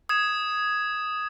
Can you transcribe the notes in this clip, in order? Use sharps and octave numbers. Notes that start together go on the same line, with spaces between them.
D#6 G#6 E7